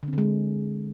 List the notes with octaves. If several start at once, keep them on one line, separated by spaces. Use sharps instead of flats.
D3
C4
D3
G#3